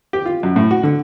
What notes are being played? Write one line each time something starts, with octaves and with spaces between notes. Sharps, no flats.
G4
F4
F#2
A2
F#4
D3